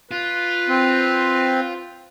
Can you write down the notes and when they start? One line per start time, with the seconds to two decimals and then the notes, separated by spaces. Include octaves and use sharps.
0.11 F4 B4
0.69 C4